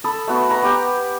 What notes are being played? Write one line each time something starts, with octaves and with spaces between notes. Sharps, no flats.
A4 B5 D#6
A3 B3 F#4
B4 A#5
B3 G4 G5